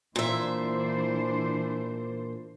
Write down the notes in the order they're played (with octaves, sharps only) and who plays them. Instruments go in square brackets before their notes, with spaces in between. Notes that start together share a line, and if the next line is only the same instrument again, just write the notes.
[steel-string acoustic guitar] A#2 E5 [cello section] E3 D4 C5